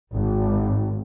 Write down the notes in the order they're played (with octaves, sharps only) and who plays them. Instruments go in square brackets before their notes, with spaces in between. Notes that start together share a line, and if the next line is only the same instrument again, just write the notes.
[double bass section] G#1